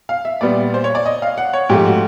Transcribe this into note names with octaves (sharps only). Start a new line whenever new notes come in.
F5
E5
A#2 G3 B3 D5
C5
C#5
D5
D#5
F5
F#5
C#5
G#2 F3 A3 G4
F#4